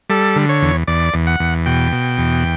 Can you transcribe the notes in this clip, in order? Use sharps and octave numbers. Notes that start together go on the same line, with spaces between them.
G3 A4
D3
C#5
E2
E2 D5
E2
F#5
E2
B2 G5
B2
E2